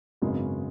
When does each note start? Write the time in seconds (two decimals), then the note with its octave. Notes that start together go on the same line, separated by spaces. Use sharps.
0.22 G#1 F#2 C#3 G#3 B3